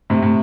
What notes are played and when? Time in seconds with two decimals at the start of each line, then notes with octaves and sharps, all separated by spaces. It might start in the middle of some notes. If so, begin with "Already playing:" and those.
0.10 A2 C3
0.22 A2